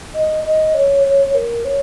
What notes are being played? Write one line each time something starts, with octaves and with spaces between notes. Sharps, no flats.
D#5
D#5
C#5
C#5
C#5
A#4
C#5